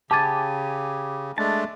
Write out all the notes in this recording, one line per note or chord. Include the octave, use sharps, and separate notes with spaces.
C#3 G4 G#5 A5 D6 A6
G#3 A3 D4 A5